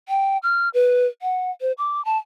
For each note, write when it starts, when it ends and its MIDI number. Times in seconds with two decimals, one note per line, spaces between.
0.09 0.38 79
0.43 0.69 89
0.74 1.07 71
1.22 1.51 78
1.61 1.72 72
1.78 2.04 86
2.05 2.18 81